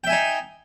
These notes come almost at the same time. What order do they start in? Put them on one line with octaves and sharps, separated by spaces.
G5 E5 G#5 D#4